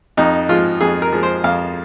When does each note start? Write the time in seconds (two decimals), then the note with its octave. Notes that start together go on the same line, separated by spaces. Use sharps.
0.17 F2 D#4
0.49 F3 G#3 F4
0.81 F2 G#4
1.02 A#4
1.12 F3 G#3
1.23 C5
1.44 F2 F5